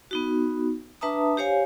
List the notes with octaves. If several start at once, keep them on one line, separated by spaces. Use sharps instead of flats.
B3 D#4 F#4
D4 B4 E5 A5 A#5 D#6
G4 C5 C#5 F5 G#5